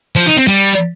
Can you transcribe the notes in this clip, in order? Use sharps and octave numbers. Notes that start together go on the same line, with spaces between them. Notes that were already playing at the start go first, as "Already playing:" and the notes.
F3
D#4
C4
G3